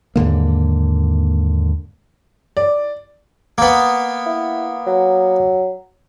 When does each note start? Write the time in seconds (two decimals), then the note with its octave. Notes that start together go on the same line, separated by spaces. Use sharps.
0.16 D#2 G#2 D3 A#3
2.57 D5
3.58 A#3 B3
4.26 E4
4.87 F#3